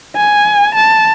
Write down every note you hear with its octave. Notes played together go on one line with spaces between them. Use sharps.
G#5
A5